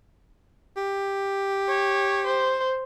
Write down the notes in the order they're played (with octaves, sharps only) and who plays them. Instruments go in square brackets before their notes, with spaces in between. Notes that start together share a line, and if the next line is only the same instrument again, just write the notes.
[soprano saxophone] G4
[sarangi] C#5
C5